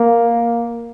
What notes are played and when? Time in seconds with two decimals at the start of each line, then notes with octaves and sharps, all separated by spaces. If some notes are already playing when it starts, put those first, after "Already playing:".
Already playing: A#3